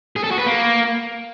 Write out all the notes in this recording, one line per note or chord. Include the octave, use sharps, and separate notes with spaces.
G#4
A4
F#4
B4
A#3